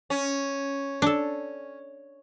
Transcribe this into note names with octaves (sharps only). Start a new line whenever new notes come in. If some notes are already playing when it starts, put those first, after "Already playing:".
C#4
D4 A4